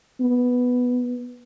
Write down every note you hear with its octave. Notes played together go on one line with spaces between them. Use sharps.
B3